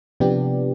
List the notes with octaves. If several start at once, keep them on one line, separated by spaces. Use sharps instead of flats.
C3 F3 B3 D4 G4